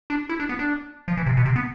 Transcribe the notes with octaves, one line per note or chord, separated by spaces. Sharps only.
D4
E4
D4
B3
D4
F3
E3
C3
B2
C3
B3